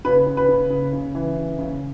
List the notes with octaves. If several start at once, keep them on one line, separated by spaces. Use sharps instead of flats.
C#3 B4
C#3
B4
C#3
C#3
C#3
E3
C#3
C#3